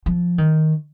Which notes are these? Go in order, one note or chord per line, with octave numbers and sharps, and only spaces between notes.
F3
D#3